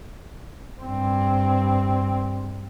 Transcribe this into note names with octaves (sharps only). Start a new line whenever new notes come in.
G2 C4